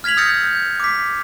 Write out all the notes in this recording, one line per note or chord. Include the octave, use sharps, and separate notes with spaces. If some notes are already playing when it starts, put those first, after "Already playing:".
F6 G#6 B6 F7 F#7
D#6 E6 G6 A6 A#6 C#7
G6
D6 B6